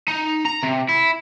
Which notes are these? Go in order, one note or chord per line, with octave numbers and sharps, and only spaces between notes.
D#4
A#5
C3
E4